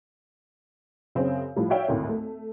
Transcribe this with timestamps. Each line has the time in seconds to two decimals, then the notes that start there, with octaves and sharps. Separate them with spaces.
1.15 F#2 C#3 C4
1.56 A2 F3 G3
1.70 F#4 C#5 D5 E5 F5 G5
1.88 G#1 D2 A2
2.09 A3